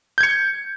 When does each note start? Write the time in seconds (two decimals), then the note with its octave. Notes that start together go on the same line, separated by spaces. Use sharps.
0.18 G6
0.21 G#6
0.23 C#7